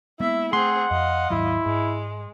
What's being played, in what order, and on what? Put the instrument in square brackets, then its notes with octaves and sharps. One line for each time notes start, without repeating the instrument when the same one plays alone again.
[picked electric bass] G#3 A#3 B3 [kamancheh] E4 E5
[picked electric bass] A3 [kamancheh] C4 G#4 [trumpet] F#5 [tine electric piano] C6
[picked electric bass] F2 [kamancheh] D#5 F5
[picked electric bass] D#2 G#2 F#3 [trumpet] E4
[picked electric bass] G#2 [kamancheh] G#3